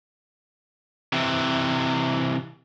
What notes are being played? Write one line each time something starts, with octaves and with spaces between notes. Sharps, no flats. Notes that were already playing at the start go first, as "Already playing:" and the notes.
C3 E3